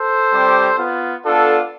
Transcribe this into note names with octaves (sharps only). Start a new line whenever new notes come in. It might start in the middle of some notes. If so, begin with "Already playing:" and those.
Already playing: A4 C5
G3 C4 G4
B3 F4
B3 D4 F4 A4